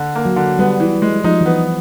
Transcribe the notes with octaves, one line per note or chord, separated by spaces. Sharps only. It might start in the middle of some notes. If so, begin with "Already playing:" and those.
Already playing: D3
A#3
F#3
D3
G3 B3
E3
G#3
F3 D#4
E3
B3